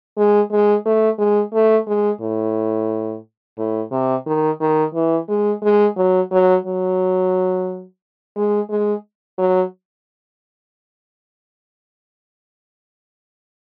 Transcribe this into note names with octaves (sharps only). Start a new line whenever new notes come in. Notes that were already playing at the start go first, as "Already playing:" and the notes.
G#3
G#3
A3
G#3
A3
G#3
A2
A2
C3
D#3
D#3
E3
G#3
G#3
F#3
F#3
F#3
G#3
G#3
F#3